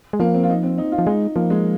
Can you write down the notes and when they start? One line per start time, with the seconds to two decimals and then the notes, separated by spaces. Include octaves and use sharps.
0.13 G#3
0.20 F3 A#3
0.34 C4
0.43 F4
0.50 D#4
0.63 C4
0.78 D#4
0.92 F4
0.98 F3
1.07 G#3 D#4
1.36 F3 A#3
1.50 G#3